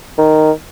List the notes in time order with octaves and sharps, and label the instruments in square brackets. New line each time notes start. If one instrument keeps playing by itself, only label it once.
[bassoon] D#3